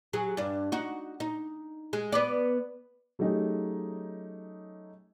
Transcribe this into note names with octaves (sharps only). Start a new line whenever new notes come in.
F#3 G#4
G2 D4
D#4 F#4
D#4
G#3
B3 B4 D5
F#3 A3 C#4 D#4 G4 G#4